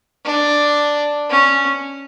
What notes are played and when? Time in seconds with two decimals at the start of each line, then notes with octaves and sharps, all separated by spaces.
0.25 D4
1.30 C#4